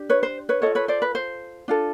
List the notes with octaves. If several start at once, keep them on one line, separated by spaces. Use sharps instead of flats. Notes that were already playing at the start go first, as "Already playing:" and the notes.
Already playing: D4 G4
B4 C#5
C5
B4 C#5
F4 A4 C#5 D#5
B4 C#5
C5 D5
B4
C5
D4 F4 A4